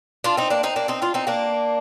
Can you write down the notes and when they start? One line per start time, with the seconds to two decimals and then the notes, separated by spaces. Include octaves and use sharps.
0.24 D4 F4
0.37 C4 D#4
0.50 A#3 D4
0.63 C4 D#4
0.76 A#3 D4
0.88 C4 D#4
1.02 D4 F4
1.14 C4 D#4
1.27 A#3 D4